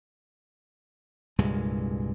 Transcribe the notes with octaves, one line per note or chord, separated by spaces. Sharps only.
C2 G2 A#2 G#3